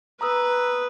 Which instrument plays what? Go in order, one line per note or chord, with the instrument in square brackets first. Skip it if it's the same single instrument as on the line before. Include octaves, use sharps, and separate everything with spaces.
[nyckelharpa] B4 [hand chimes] A#5 D#6 E6